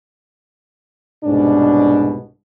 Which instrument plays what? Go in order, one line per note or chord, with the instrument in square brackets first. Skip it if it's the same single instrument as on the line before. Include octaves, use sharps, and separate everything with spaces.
[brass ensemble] C2 G#2 B2 C#4 D4